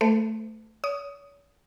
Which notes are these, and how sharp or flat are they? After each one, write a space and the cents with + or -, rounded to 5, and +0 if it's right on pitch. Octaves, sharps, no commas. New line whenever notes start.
A3 +0 C5 -45
C#5 +40 D#6 +0